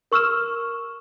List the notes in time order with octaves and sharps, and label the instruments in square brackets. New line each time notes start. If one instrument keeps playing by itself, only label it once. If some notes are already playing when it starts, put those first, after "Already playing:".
[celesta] A#4 C#6 E6 F6 E7